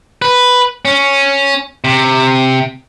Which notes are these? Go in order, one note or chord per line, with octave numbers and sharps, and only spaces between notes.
B4
C#4
C3